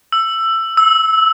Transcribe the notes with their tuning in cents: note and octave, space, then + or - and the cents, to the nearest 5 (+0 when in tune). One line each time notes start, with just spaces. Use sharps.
E6 +15
E6 -15